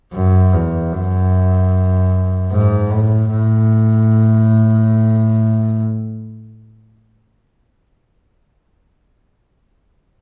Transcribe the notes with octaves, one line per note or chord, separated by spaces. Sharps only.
F#2
E2
F#2
G#2
A2
A2